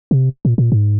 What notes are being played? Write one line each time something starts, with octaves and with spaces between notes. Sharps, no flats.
C3
A#2
A#2
G#2